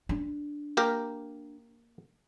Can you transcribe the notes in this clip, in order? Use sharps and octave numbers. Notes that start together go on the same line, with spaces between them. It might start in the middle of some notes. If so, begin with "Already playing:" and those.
D4
A#3 G4 A#4